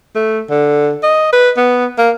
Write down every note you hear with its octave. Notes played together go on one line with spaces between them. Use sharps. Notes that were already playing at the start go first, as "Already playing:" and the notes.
A3
D3
D#5
B4
B3
A#3